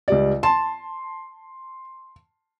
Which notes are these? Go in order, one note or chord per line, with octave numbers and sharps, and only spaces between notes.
C#2 G3 D5
A5 C6